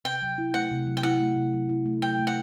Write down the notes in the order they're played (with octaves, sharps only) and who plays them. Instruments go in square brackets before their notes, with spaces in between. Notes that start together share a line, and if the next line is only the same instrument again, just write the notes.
[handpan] C3 [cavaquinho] G5
[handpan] F#3
E4
[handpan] A3 [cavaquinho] F#5
[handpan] C3
F#3
[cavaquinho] G5
[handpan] E4 [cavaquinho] F#5
[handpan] A3
C3
F#3
E4
A3
[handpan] F#3 [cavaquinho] G5
[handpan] A3
[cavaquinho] F#5